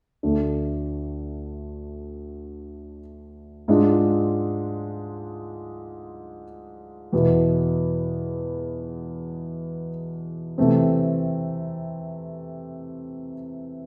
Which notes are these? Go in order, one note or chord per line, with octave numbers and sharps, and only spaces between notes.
D2 D3 A3 D4
G#2 G#3 D4 F4
E2 B2 B3 E4
C3 E3 A3 C4